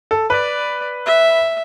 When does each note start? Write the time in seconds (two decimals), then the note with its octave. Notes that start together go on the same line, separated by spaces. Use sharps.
0.11 A4
0.30 B4 D5
1.06 E5